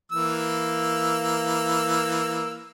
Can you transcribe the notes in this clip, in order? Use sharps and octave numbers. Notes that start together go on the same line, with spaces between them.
E3 A#3 E6